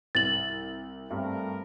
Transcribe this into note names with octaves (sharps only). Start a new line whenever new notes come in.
C2 A6 F#7
G2 A3 C4 A#4